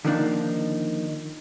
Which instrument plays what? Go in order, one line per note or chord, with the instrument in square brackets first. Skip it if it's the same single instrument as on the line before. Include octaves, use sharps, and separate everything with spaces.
[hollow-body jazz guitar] D3 D#3 F3 A#3 D4 D#4